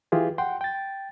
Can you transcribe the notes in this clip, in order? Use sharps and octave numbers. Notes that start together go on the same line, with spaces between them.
E3 F4 G4 G#4
F#5 G5 C6
G5 A6